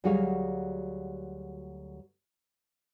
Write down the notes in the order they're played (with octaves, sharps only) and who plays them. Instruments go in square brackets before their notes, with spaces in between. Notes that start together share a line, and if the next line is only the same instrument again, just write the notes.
[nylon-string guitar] D2 F#3 G3 F#4 G#4 F5